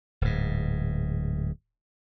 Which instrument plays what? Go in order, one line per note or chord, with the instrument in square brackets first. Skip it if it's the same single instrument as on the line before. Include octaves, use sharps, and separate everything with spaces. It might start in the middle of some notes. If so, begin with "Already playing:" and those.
[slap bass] D1 G#2